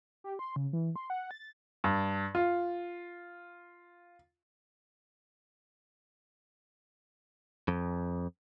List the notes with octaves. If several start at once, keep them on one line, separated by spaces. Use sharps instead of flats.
G4
C6
C#3
E3
C6
F#5
A6
G2
F4
F2